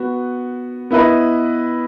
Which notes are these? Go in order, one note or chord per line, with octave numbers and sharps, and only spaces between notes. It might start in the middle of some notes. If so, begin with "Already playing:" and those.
Already playing: B3 F#4
B3 E4 B4 D#5